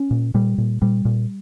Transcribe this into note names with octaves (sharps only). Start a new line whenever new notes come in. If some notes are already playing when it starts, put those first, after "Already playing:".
Already playing: C#4
A#2
A#2 G3
A#2
A#2 G3
A#2